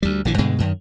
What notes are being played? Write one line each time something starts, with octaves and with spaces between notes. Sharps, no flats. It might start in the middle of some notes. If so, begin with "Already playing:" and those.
D2 G3
A#1 D3 E3
G2 B2 D3 G#3
F#2 D#3